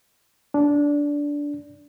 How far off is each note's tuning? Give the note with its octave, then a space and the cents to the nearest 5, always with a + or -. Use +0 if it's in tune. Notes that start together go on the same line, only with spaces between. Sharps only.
D4 -15